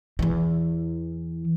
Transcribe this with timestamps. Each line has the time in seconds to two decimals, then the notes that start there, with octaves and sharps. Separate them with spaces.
0.19 E2 E3